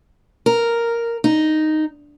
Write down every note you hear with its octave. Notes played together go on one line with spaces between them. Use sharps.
A#4
D#4